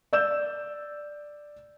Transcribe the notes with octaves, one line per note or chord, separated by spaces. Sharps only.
D5 E6 G6 E7